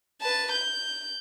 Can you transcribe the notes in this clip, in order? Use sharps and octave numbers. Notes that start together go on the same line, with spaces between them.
B4 A5
G6